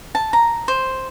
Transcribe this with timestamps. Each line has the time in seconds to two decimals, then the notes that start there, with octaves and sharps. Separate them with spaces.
0.15 A5
0.33 A#5
0.68 C5